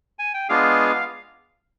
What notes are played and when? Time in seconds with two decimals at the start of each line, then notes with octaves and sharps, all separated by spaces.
0.19 G#5
0.34 G5
0.49 G#3 B3 D4 F4 G#4 F5